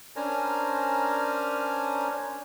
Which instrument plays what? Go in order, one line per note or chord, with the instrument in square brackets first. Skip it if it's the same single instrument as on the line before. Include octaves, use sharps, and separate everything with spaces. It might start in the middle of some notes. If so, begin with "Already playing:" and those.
[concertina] C#4 D4 A#4 C5 G#5 A#5